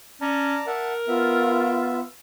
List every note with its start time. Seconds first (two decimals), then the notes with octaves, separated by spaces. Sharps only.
0.21 C#4 D5 A5 A#5
0.67 A#4 E5 F#5 A5
1.08 B3 F4 E5